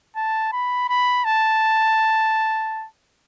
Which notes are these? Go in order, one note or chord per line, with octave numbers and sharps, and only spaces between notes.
A5
B5
B5
A5